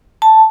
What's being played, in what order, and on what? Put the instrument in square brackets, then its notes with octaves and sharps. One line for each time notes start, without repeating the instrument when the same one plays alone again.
[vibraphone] A5